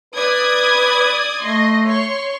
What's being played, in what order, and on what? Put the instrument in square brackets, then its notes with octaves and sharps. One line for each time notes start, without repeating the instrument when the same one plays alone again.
[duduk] B4 [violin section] D5 D#6 G#6
[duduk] A3 [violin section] D#5 C6
[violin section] C#5 C6 C#6